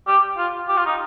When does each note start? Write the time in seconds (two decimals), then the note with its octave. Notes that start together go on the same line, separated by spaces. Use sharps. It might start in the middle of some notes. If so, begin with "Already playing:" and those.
0.08 G4
0.38 F4
0.69 G4
0.77 F4
0.86 D#4